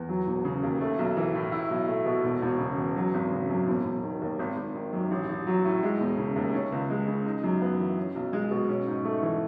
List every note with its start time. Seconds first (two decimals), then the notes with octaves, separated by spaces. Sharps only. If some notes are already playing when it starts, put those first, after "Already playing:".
Already playing: E2
0.09 F#3
0.27 E1
0.45 C#3
0.63 D#2
0.81 A3
0.99 B1
1.17 E3
1.35 A2
1.52 E4
1.71 B1
1.88 A3
2.06 B2
2.24 E1
2.42 E1
2.60 C#3
2.78 E2
2.96 F#3
3.14 G#1
3.31 C#3
3.49 F#2
3.67 E1
3.85 E1
4.03 D#3
4.21 D#2
4.39 G#1
4.57 G#1
4.75 D#3
4.93 F#2
5.11 A1
5.29 A1
5.47 F#3
5.65 A2
5.83 G#3
6.00 E1
6.18 C#3
6.36 D#2
6.54 C#4
6.72 C#2
6.90 G#3
7.08 C#3
7.26 D#4
7.44 F#2
7.62 B3
7.80 E3
7.97 C#4
8.15 B1
8.33 G#3
8.51 B2
8.69 C#4
8.87 G#2
9.05 A3
9.23 E3